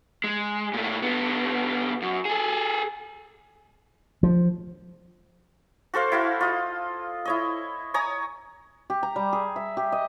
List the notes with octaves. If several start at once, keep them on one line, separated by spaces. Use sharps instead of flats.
G#3
A#2 A3
D3 B3
F#2
G#4 A4
F3
F#4 A4 C5 F5
E4 F#4 F5
F4 D#5
E4 C#5 D#5
C#5 G#5 A#5 D#6
G4
A#5
G3
G#4
E5
G4
D#5